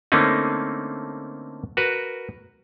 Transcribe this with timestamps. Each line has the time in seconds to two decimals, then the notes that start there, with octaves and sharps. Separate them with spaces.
0.12 D3 A3 A#3 C4 C#4 D#4
1.77 F#4 A#4 B4